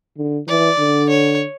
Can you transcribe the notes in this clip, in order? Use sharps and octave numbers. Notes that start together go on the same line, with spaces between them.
D3
E3 D5
D3
C#5